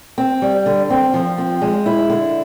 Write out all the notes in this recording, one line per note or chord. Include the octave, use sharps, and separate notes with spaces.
C4
G3
D3
C4
F3
C4
G#3
E4
D3